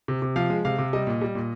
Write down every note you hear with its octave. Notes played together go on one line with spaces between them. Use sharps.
C3
C3
F3 F5
G#3
C3 F5
C3
G3 D#5
A#2
G3
A#2